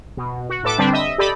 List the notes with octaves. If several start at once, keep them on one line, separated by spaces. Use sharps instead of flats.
B2
F#4
A2 A4 B4 D6
D3 G3 C4 D4 B4
D#5 E5
G4 A4 D5 D#5 B5